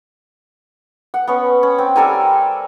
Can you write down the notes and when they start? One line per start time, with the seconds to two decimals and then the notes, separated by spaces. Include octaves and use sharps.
1.14 F#5
1.27 B3 C#4
1.63 C#4
1.78 C4
1.96 G3 A4 A#4 G#5